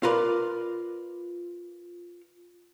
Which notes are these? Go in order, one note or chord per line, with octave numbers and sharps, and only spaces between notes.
F4 A#4 B4 D5